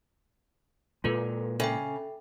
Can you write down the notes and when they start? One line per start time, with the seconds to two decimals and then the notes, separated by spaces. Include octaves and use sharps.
1.04 A#2 G#3 F4 A4 B4
1.60 C#3 A4 E5 G5